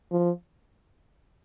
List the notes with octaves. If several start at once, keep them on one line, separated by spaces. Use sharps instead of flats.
F3